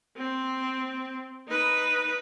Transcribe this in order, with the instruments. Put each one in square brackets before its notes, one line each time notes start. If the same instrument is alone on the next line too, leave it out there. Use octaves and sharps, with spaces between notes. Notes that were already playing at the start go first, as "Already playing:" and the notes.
[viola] C4
D#4 B4